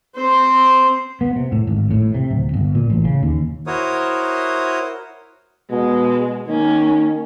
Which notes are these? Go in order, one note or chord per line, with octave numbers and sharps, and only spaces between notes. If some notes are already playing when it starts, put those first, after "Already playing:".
C4 C5
B3
C3
A2
G#1
A2
C3
D1
G1
A#2
A1
C#3
D#2
E4 F#4 A#4 C5 C#5 D#6
B2 G#3
D#3 A#3 C#4